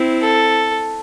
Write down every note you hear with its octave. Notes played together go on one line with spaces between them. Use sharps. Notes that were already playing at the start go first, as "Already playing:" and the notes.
Already playing: C4 E4
A4